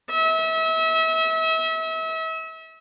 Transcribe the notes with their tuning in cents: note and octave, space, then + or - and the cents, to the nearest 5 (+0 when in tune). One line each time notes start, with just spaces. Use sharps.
E5 -35